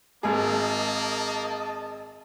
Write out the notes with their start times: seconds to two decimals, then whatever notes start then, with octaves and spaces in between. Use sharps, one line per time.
0.23 G#1 A#3 G#4 D#5 A5